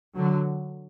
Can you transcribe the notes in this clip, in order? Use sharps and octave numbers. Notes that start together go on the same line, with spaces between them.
D3 F#3